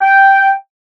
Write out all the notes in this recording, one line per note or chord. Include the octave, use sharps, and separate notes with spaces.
G5